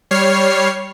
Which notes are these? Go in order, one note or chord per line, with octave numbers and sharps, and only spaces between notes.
G3 C#5 F6 C7